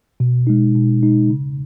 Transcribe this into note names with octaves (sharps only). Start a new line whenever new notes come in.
B2
G#3 D#4
B2
G#3 D#4
C#3